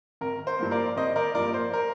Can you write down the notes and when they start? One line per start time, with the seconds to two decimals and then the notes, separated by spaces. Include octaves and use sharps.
0.21 G#1 A#4
0.47 C5
0.59 G2 F3 A#3
0.71 A#4 D5
0.97 G#1 C5 D#5
1.16 A#4 D5
1.35 G2 F3 A#3 A#4 D5
1.54 C5
1.73 A#4